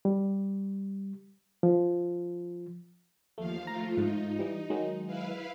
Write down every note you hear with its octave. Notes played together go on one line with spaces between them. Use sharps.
G3
F3
D#2 F3 A3 F5
F3 A3 F4 A#5
G#2 D#4
E3 G3
D#3 F#3 G#3
E4 B4 F5